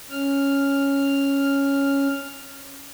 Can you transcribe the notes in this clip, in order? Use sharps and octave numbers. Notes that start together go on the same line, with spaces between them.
C#4 F6